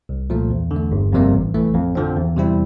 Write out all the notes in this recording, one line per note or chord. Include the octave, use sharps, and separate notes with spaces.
C2
A#2 F3 A3
E2
D3
A3
G1
F2 C3 G3 A#3
A1
A2 E3 A3
F2
D3 F3 C4
E2
C3 G3 C4 E4